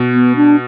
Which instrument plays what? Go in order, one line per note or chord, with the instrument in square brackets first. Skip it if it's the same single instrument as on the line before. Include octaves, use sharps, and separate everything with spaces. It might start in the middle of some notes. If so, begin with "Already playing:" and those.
Already playing: [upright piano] B2
[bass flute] B3
D4